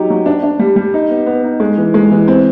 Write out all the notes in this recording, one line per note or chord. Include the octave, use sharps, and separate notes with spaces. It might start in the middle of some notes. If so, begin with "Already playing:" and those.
Already playing: F#3 D#4 G4
F#3
D4
D4
G3
G3
D#4
B3
B3
D#4
G#3
E3
G#3
E3
C4